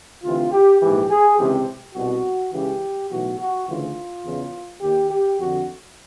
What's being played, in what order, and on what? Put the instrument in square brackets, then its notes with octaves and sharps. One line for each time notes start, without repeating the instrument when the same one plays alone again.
[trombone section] D2 C3 E3 F4
G4
A#1 G#2 E3 G4
G#4
C#2 C3 E3 G4
C2 B2 F#4
C#2 C#3 E3 G4
B1 A2 E3 F#4
F#4
D2 C#3 E3 F4
E2 C#3 E3
D#2 D#3 G4
G4
F2 D3 F#4